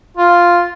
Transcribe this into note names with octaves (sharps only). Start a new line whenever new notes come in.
F4